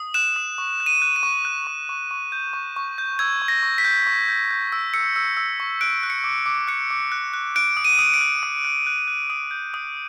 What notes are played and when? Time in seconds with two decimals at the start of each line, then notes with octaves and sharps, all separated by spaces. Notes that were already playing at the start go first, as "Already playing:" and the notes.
Already playing: D#6
0.14 F#6 E7
0.36 D#6
0.58 C#6
0.80 F#6
0.86 D#7
1.02 F#6
1.16 D#7
1.23 C#6
1.45 F#6
1.67 C#6
1.89 C#6
2.11 C#6
2.32 G6
2.53 C#6
2.76 C#6
2.98 G6
3.19 E6 G#6
3.42 C#6
3.48 A#6
3.63 C#6
3.78 B6
3.84 G6
4.07 C#6
4.29 G6
4.51 G6
4.72 E6
4.94 E6 C#7
5.16 E6
5.37 E6
5.60 C#6
5.81 F#6 D7
6.03 F#6
6.10 C#7
6.24 D6
6.46 D6
6.68 F#6 C#7
6.90 D6
7.12 F#6
7.33 F#6
7.56 F#6 D7
7.77 D#6
7.85 D#7
7.99 D#6
8.14 D7
8.21 F#6
8.43 D#6
8.64 F#6
8.87 F#6
9.08 F#6
9.30 D#6
9.51 G6
9.74 D#6